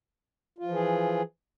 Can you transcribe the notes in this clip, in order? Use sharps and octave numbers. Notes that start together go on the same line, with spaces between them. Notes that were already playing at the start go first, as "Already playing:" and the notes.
E3 F3 F4 G#4